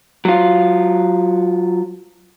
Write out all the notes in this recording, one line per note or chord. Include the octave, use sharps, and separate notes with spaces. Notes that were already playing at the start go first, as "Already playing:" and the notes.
F#3 F4